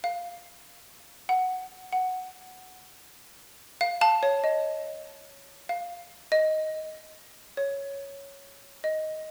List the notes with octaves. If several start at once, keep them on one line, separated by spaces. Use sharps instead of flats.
F5
F#5
F#5
F5
F5 A5
C#5
D#5
F5
D#5
C#5
D#5